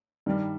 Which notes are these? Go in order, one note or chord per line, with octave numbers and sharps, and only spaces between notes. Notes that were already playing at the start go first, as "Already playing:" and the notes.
G2 D#3 G3